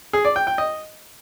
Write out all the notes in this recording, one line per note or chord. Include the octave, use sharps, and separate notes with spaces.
G#4
D5
G5
G5
D#5